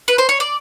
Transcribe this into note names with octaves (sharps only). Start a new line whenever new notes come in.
B4
C5
C#5
D5